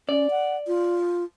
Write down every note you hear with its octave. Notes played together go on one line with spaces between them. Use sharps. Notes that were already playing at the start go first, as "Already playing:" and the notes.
C#4 D5
F#5
F4